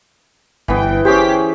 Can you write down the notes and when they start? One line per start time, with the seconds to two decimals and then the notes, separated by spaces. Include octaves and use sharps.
0.68 G1 E3 B3 G5
1.05 C#4 G4 G#4 C5 B6